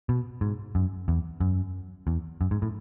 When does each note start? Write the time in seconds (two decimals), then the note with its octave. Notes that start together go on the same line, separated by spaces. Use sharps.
0.09 B2
0.41 G#2
0.75 F#2
1.08 E2
1.40 F#2
2.07 E2
2.41 F#2
2.51 G#2
2.62 A2